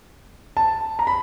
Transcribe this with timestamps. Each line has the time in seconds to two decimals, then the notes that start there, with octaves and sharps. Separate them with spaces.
0.57 A5
0.99 A#5
1.07 B5